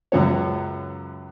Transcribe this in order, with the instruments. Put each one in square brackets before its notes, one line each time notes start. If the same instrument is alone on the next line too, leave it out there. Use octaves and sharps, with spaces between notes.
[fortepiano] C#2 F#2 B3 C#5